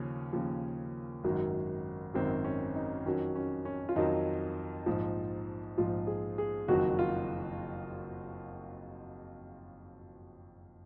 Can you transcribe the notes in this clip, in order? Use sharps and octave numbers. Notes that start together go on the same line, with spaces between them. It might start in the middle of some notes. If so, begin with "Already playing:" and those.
Already playing: D#2 C#3 F3 C#4
D#2 C#3 F3
G#1 F#2 D#3 F#3
G#1 F#2 D#3 F#3 C4
C#4
D#4
F2 D#3 F#3 C#4
C#4
C#4
F4
F2 D#3 F#3 D#4
A#1 G#2 F3
A#1 G#2 F3 F4
G#4
G#4
F#1 F2 D#3 F#3 F#4
F4